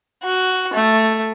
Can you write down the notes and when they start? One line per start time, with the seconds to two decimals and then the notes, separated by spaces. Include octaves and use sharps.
0.23 F#4
0.74 A3